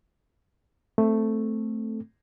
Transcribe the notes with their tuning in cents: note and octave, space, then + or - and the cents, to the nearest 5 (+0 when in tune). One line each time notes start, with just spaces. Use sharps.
A3 +5 C4 +0 A4 +0